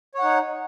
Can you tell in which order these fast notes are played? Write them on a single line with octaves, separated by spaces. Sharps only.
C#5 F#5 D#4